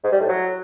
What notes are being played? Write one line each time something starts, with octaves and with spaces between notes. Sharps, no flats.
G#2
G3
A2
F#3